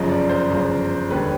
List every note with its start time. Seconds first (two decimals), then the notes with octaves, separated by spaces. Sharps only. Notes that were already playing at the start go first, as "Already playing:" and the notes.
Already playing: G1 F#2 C#3 F3 D#5
0.09 D5
0.29 C5
0.50 G1 F#2 C#3 F3
1.11 E1 D#2 D3 G3 B4